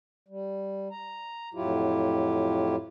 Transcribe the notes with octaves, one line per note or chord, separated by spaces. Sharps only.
G3
A#5
F2 A2 F#3 E4 F4 G4